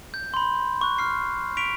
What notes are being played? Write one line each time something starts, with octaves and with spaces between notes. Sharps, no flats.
G6
B5 C6
C#6 F#6
C#6 F6 C7
C#6 B6 D7 F7